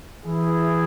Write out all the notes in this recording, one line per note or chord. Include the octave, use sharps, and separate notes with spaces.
E3 E4 G#4